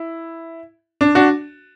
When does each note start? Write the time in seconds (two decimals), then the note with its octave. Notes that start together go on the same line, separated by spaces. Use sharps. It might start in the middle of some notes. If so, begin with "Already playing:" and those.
Already playing: E4
1.01 D4
1.15 D4 F#4